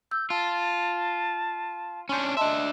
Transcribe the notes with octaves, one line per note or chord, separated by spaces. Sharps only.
E6 G6
F4 A5
C#4 D4 G#5 C6 G6
D4 D#5 E5 A5 C6